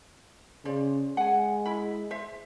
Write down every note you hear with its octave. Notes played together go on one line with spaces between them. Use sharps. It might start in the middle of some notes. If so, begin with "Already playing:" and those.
C#3 C5 D5
G#3 F#5 G#5
E4 B5
C5 E5